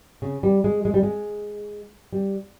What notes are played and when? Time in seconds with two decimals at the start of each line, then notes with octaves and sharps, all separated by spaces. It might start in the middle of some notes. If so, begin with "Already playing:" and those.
0.22 C#3
0.43 G3
0.64 G#3
0.85 G#3
0.94 G3
1.03 G#3
2.13 G3